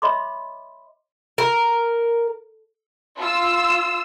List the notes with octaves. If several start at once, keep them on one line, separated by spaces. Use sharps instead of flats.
C#5 D#5 E5 B5 C6 D6
A#4
F4 E6